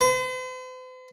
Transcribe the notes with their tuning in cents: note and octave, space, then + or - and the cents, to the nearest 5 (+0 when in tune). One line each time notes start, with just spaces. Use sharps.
C5 -45